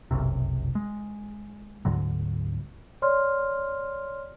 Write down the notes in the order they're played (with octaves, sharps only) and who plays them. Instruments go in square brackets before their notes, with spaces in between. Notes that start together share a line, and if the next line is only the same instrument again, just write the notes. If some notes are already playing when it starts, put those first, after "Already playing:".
[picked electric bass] F1 B1 F#2 C3
G#3
D2 G#2 D3 F#3
[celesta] C#5 D5 C6 F6